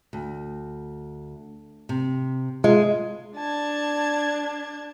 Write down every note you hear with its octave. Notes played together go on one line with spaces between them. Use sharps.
D2
C3
G#3 F4
D4 A5 G#6